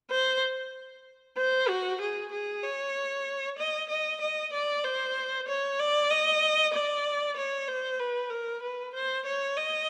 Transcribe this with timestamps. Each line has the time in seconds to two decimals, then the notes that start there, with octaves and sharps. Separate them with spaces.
0.11 C5
1.37 C5
1.68 F#4
2.01 G#4
2.32 G#4
2.63 C#5
3.58 D#5
3.89 D#5
4.21 D#5
4.52 D5
4.84 C5
5.47 C#5
5.79 D5
6.10 D#5
6.74 D5
7.36 C#5
7.68 C5
7.99 B4
8.30 A#4
8.62 B4
8.94 C5
9.26 C#5
9.57 D#5